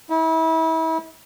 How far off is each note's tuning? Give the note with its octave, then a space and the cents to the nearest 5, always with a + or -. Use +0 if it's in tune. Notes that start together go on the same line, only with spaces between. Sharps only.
E4 -35